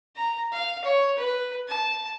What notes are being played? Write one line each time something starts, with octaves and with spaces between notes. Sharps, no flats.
A#5
F5
C#5
B4
A5